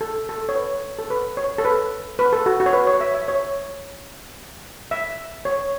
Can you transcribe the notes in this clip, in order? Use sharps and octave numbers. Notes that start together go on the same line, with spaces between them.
A4
A4
C#5
B4
A4
B4
C#5
A4
B4
B4
A4
F#4
F#4
C#5
B4
C#5
E5
E5
C#5
E5
C#5